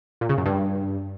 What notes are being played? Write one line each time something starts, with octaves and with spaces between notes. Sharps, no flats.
A#2
C#3
F#2
G2